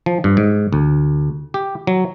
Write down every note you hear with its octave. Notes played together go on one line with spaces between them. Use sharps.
F3
G2
G#2
D2
G4
F#3